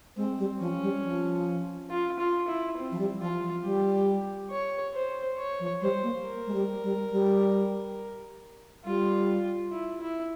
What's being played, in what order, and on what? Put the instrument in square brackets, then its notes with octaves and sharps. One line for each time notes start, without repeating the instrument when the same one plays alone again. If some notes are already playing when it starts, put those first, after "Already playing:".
[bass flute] G#3 [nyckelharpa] C4
[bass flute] G3
[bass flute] F3 [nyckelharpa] C#4
[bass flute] G3
F3
[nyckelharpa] F4
F4
E4
C4
[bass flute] F3
G3
[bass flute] F3 [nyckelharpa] F4
[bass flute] F3
[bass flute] G3 [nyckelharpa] G4
[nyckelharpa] C#5
C5
C#5
[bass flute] F3
[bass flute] G3 [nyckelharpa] C5
[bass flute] A#3
[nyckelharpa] A#4
[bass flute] G#3
G3
G3
G3
[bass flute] G3 [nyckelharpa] F4
[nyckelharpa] E4
E4